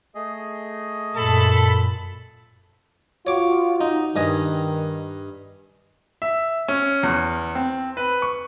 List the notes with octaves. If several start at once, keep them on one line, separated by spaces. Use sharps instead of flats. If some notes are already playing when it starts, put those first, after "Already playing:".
A3 G#4 D#5
F#2 A#2 A4 A5 B5
F4 F#4 C#5 D6
D#4
G2 D#3 D#5 G#5
E5
C#4
E2
C4
B4
C#6